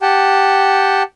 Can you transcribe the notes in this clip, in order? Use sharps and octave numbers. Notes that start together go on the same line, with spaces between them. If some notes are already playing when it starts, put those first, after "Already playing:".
G4 F#5 G5 A5